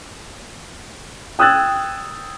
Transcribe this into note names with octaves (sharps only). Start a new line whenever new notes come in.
G5 D#6 E6 F#6 G#6 A6